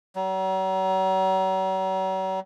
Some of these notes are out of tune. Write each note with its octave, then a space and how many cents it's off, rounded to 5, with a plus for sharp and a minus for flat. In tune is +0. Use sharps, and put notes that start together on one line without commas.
F#3 +40